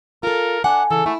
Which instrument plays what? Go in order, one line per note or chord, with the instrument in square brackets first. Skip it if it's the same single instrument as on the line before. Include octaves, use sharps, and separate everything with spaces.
[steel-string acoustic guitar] F4 A4 [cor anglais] A#4
[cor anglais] D4 [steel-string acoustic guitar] F#5 [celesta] G#5
[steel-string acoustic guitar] C#3 E3 [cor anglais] A4
[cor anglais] A3 [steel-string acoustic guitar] E4